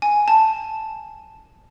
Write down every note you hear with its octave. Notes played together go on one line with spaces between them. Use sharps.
G#5
A5